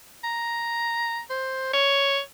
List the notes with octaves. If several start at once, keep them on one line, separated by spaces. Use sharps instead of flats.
A#5
C5
C#5